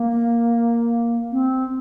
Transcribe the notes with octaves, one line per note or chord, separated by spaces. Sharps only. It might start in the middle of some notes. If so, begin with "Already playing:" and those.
Already playing: A#3
C4